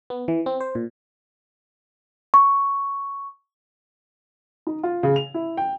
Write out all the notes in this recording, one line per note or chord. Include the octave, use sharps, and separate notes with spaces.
B3
E3
C4
C5
A#2
C#6
D#4
F4
C#3
F7
E4
G5